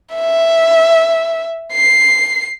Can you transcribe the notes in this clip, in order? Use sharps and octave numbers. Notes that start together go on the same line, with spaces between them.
E5
C7